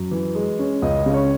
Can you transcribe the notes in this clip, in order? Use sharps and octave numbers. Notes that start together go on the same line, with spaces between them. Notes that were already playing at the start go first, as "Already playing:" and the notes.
Already playing: F#2
E3
G#3
C#4
C#2 D#5
C#3
C#5